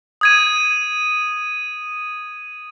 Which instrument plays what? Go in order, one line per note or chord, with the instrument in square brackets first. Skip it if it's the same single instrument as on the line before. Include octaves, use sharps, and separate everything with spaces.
[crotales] D#6 G#6 D#7